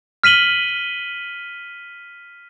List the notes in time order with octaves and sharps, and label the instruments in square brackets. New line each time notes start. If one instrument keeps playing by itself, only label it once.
[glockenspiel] F6 B6 D#7 F#7 G7